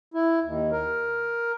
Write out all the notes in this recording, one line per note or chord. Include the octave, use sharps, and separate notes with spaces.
E4
D#2
A#4